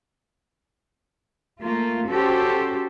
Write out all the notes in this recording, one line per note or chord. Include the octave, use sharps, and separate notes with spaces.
A3 A#3 F4
C#4 F#4 G4 A4 C5